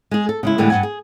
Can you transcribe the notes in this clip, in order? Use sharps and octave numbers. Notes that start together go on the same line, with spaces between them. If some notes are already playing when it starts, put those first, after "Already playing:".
G#3 G#4
A4
C#3 G#3 E4
A2 D3 E3 G3 G#3
G2 A3 F#5 G#5
G#4